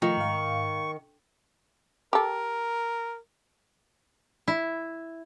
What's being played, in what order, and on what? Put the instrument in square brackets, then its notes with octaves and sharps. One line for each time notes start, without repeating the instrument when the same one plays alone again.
[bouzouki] D#3 [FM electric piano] F3 A3 F4 [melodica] C#6
[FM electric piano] G#2 F5
[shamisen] G4 A4 [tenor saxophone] A#4
[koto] E4